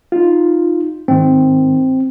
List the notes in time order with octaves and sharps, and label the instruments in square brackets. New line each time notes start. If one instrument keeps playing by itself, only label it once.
[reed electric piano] D#4 F4
[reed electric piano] G#2 D#3 [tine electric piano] C4